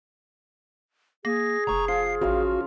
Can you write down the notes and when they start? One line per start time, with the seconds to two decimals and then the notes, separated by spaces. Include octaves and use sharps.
1.25 A#3 G#4 A#6
1.67 F1 A#5 C#6
1.88 F3 C7
2.22 A1 C#3 F4 F#4 F5